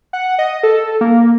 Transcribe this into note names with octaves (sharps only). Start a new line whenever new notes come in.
F#5
D#5
A4
A#3